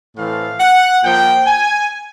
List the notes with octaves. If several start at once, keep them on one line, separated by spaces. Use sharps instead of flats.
A2 E3 A3 C4 F5
F#5
A#2 F3 A#3 G5
G#5